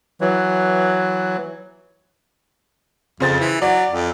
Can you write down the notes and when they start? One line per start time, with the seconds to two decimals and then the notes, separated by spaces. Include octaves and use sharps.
0.21 E3 F#3
3.20 F2 C#3 C5 A6
3.40 E3
3.62 F#3 D5
3.91 F2